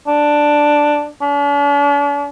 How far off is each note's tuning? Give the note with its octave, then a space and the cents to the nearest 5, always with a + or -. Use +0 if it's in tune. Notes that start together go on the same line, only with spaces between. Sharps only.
D4 +5
D4 -45